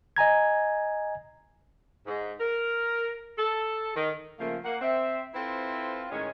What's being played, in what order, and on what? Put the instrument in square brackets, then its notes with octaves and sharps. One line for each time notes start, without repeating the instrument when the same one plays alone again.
[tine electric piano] D#5 G#5 A#5 G#6
[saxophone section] G#2
A#4
A4
D#3
C#3 F3 A3 A#3
A#3 F#5
C4 E5
C4 E4 F4 A4 B4 C5
A2 D#3 G#3 C#4